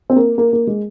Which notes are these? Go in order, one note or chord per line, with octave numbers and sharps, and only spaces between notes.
C4
A#3
A#3
A#3
G#3